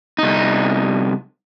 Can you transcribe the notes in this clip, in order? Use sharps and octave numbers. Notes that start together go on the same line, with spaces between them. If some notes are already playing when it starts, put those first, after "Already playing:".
C2 D#4